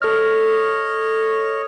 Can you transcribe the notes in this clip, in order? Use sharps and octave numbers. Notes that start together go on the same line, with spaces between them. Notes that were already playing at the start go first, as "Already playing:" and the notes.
A4 C#5 D#5 F6